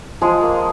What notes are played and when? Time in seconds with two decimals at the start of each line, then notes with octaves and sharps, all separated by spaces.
0.21 F3 G#3 G#4
0.42 A#3